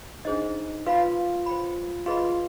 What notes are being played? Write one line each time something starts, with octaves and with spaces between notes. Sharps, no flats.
D4 D#4 G#4 C5 D#5
F4 B4 F5 B5
C5 G5 B5
F4 G#4 B4 D#5 B5